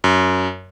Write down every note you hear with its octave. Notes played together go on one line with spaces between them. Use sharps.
F#2